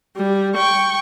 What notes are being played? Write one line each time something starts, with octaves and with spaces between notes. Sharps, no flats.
G3
G5 C#6